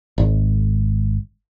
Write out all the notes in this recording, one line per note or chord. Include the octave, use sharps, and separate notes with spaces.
G#1